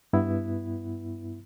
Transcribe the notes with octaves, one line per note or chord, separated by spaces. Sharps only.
G2 B3 E4